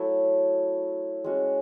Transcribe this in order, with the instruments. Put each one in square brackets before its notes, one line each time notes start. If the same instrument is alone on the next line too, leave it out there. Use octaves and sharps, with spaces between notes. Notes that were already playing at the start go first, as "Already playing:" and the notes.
Already playing: [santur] F#3 A3 E4
G#3 C#4 F#4